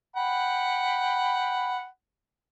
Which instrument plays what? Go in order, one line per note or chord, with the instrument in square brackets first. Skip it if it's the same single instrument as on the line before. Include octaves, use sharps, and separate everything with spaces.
[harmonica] F#5 G5 B5